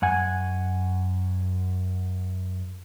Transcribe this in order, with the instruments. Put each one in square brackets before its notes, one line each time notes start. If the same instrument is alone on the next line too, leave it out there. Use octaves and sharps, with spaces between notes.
[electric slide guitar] F#2 F#5 G#5